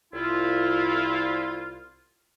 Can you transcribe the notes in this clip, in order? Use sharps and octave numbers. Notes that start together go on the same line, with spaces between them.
C2 E4 F4